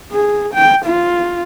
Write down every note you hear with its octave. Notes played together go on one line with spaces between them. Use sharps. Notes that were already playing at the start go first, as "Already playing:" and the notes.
G#4
G5
F4